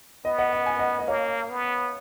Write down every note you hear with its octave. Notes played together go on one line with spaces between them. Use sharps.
B3 D#5
D#5 F#5
F#5
G#5
D#5 F#5
D#5
A#3 C#5 F5
B3